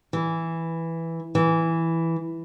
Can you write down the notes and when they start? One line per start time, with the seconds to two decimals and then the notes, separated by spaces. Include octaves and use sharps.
0.13 E3
1.35 E3